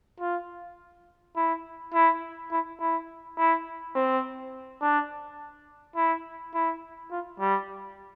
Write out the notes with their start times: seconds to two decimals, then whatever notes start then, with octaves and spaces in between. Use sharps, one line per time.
0.20 F4
1.36 E4
1.94 E4
2.51 E4
2.79 E4
3.38 E4
3.95 C4
4.81 D4
5.96 E4
6.54 E4
7.11 F4
7.40 G3